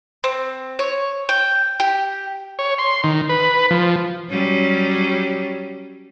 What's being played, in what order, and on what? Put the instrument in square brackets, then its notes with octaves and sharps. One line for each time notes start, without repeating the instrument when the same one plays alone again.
[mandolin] C4
C#5
G5
G4
[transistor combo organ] C#5
C6
D#3
B4
F3
[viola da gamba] F#3 G3 C#4